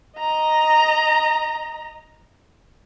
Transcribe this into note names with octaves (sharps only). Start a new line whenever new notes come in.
D#5 A#5